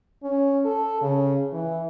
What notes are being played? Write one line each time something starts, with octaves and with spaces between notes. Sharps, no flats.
C#4
A4
C#3
E3